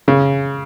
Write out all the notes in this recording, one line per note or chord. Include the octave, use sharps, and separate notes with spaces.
C#3